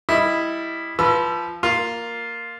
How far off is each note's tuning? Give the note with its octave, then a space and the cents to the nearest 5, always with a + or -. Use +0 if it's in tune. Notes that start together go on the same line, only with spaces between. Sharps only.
G3 +0 E4 +0 D#5 +0
F3 -10 B4 -10 E6 +30
A#3 +0 F4 +0